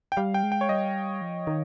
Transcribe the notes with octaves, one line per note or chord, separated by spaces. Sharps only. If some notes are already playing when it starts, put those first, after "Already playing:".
G5
G3 F5
G5
G#3
G5
C#5
G3 D#5
F3
D#3